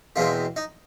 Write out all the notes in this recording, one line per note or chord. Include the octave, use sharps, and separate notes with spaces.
E2 B2 G#3 C4 F4
D#4